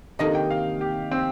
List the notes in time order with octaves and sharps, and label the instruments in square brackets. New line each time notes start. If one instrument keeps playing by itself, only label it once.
[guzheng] C3 D#3 A#3 D#4 [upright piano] D#5
[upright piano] G5
F5
G4
C4